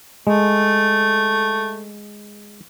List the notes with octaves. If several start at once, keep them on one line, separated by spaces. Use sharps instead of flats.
G#3 A3